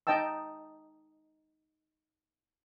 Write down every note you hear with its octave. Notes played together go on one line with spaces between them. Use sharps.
D#4 D#5 G5 A5 E6